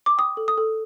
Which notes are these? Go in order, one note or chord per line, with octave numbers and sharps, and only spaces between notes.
D6
G5 D#6
A4
D#6
A4